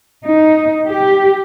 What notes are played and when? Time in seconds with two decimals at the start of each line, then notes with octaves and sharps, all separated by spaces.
0.25 D#4
0.86 G4